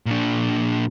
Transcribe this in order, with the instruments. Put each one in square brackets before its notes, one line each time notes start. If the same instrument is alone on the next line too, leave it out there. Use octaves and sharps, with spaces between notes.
[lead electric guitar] A#2 D4